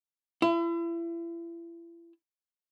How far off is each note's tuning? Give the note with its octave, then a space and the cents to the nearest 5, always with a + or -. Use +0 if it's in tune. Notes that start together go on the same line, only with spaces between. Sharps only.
E4 +35